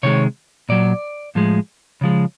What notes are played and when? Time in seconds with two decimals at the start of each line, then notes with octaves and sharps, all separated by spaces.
0.03 C3 D#3 G#3 C#5
0.69 A#2 F#3 D5
1.35 A2 F3 G#3
2.01 C#3 F3 G#3